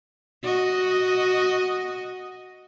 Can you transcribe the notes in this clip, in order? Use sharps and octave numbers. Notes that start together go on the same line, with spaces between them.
F#4 D#5